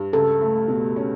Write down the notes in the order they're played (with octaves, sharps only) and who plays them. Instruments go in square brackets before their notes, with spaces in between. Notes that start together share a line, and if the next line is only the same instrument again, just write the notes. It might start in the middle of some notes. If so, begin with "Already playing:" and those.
Already playing: [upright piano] G2
[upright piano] C#2 [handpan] A4
[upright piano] A3
B2
C#4